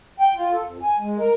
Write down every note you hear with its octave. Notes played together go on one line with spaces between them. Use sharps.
G5
F4
A4
F2
G#5
G#3
A#4